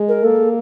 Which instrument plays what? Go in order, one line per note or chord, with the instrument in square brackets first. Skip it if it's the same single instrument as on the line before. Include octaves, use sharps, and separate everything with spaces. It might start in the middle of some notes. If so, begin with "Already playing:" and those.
Already playing: [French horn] G#3
[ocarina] A#4
[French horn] A#3 [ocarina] A4